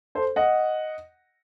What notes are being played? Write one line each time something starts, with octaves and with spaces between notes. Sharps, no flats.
A4 C5
D#5 F#5